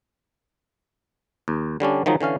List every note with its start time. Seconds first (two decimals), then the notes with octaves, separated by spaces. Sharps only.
1.48 D#2
1.80 D3 G3 C#4 D4
2.06 D#3 F3 F#3 G#3 D#4
2.21 D3 E3 C#4 F5